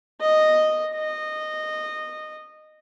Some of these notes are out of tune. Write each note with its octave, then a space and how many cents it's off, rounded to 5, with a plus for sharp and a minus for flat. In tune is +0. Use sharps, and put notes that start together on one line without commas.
D#5 -5
D#5 -15